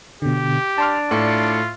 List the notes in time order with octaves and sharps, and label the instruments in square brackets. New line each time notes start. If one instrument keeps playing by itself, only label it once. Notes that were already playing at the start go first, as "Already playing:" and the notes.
[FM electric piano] B2 D3 [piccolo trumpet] G4
[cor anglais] D4 [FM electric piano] A5 C6 F6
[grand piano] A2 [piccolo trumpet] F4 [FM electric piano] D5 C#7